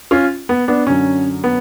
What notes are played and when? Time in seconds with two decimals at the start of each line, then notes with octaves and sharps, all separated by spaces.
0.11 C#4 F4
0.49 B3
0.68 B3 D4
0.86 F#2 D3 F#3 C#4
1.44 B3